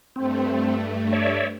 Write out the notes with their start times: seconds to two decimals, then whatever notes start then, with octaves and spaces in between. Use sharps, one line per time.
0.16 G2 A3 C4
1.13 C#5 D5 E5